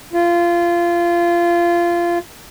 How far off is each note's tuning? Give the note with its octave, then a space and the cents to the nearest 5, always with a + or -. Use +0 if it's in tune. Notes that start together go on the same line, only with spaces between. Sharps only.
F4 -20